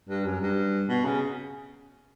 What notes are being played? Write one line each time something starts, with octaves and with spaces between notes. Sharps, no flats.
G2
F#2
G2
B2
C#3